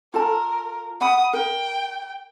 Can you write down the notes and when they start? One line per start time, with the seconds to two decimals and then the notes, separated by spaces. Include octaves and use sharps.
0.14 F4 A4 A#4 A5
1.01 F#5 B5 D#6
1.33 A#4 G5